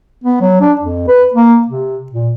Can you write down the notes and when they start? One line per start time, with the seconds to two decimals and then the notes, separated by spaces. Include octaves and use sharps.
0.24 B3
0.41 F#3
0.61 D4
0.81 F2
1.08 B4
1.34 A#3
1.68 C3
2.12 A#2